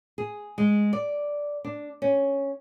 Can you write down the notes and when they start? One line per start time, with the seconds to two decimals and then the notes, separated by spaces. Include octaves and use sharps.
0.18 G#4
0.58 G#3
0.93 D5
1.64 D4
2.02 C#4